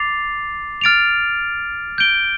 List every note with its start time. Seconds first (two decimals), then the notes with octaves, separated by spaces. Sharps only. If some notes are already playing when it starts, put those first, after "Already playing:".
Already playing: D6 A6 C7 F7
0.81 F6 A6 D7 F7
1.98 G6 D7 G7